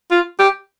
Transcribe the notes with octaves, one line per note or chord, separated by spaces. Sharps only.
F4
G4